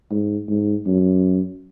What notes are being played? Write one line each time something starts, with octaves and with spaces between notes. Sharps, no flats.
G#2
G#2
F#2